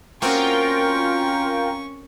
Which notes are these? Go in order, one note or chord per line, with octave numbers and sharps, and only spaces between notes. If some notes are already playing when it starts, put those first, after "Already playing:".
A#3 C4 C#4 F4 F#4 A#4 G5 C#6